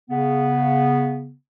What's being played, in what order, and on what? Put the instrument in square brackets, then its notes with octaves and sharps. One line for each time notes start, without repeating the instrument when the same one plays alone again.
[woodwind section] C#3 B3